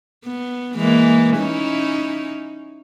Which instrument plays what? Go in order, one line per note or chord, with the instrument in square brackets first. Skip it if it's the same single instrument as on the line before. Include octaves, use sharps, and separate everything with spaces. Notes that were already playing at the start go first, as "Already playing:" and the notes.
[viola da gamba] B3
E3 G#3 A#3
C#4 D#4 E4